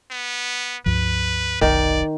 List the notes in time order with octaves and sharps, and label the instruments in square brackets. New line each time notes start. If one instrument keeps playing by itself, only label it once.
[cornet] B3
[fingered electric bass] C#2 G2 F3 [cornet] B4
[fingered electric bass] F1 B1 [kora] D#3 [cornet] D5